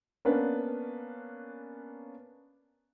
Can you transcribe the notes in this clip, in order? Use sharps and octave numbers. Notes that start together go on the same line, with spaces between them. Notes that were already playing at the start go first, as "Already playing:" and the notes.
A#3 B3 C#4 D4 B4